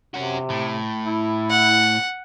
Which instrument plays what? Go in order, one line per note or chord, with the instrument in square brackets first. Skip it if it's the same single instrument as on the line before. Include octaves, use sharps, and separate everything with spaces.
[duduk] C3 [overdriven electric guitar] C#4 F#4
[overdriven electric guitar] A2
[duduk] E4
[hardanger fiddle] F#5